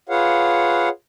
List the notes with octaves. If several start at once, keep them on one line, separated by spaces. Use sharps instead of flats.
F4 G#4 B4 C#5 F5 F#5